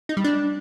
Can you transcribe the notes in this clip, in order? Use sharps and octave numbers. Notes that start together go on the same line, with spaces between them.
D#4
G3
D4